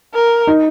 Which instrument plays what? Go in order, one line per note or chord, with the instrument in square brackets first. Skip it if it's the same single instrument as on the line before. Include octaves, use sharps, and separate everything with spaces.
[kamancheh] A#4
[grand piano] D#4